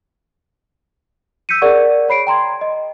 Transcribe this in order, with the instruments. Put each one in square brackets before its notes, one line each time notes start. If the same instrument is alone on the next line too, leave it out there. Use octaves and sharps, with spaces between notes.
[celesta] E6 G6 B6 C#7 D#7
G#4 A#4 D5 F#5 C#6
C#5 B5 C7 D7
G5 A#5 C6 G#6
D#5